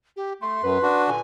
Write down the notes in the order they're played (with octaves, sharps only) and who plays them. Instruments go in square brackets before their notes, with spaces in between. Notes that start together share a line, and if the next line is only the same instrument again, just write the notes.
[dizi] G4
[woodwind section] A3 [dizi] C6
[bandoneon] F#2 [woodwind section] B4
[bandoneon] D4 F#4
[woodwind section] G2 A#2 D3 [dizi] G#5